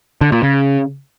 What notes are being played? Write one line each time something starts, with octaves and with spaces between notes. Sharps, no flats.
D3
A#2
C#3